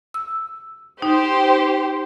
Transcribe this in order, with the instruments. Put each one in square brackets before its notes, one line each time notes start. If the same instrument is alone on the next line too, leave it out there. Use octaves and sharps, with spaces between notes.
[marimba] E6
[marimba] D#4 [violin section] G4 C5